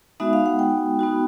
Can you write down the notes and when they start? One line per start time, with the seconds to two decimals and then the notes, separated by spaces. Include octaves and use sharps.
0.20 G#3 B3 D#4 F#4 E5
0.33 F5
0.46 F#5
0.59 G5
0.99 B3 D#4 F#4